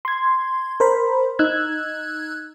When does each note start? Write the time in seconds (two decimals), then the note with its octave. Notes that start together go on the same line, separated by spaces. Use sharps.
0.05 C6 G#6
0.80 A#4 C5 B5
1.39 D#4 E6 F#6 G#6